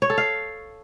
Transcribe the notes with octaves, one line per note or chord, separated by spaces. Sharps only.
C#5
A4
F5